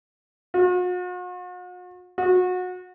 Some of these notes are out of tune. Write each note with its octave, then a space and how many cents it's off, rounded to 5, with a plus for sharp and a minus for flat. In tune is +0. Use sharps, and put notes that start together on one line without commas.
F#4 -45
F#4 -25